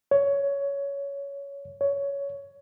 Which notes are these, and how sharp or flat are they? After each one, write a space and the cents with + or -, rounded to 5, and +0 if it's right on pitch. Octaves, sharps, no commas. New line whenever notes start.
C#5 +15
C#5 +15